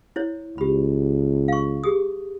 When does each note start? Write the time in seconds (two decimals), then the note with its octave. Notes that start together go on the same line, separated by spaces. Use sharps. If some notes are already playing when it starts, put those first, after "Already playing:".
0.16 E4 C5 C#5
0.58 C#2 G4 B5
1.48 F5 C#6
1.84 G4 G#4 D#6